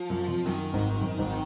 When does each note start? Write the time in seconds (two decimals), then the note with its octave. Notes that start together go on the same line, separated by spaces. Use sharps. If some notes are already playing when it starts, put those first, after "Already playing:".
Already playing: F3
0.10 F#2
0.28 F2
0.46 F#2 D#3
0.73 G#1 G#2
1.01 F#2
1.19 G#1 G#2